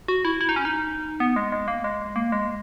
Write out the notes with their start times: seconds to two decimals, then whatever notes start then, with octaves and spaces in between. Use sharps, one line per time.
0.08 F#4
0.25 E4
0.41 E4
0.49 D#4
0.56 C#4
0.65 D#4
1.20 B3
1.36 G#3
1.52 G#3
1.68 A#3
1.84 G#3
2.16 A#3
2.32 G#3